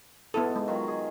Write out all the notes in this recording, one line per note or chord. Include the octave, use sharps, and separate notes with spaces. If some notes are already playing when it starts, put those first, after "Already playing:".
G#2 B3 E4 A4
G#3
D#3 F#3 F4
G#4